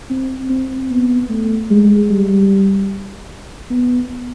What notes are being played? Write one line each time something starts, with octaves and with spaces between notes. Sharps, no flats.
C4
C4
B3
A3
G#3
G3
B3